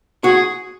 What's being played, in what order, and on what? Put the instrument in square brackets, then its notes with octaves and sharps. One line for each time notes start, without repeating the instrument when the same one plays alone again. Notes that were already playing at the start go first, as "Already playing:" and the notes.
[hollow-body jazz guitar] F#4 [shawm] G#4